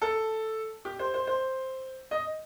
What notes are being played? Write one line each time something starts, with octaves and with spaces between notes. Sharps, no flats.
A4
G4
C5
C5
C5
D#5